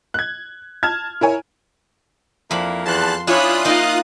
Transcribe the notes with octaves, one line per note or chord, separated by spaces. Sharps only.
F#6 G#6
A5 F6 G#6
E4 A#4 C#5 G#5
F2 A#3 D4 E4 B5
E2 A5 C6 F#6
C#4 D4 E4 F4 C#5 B5 D#6 F#6
A#3 D#4 D#5 F5